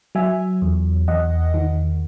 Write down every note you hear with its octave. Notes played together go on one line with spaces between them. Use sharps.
F#3 E5 G#5
E2
E2 D#5 F#5
D#3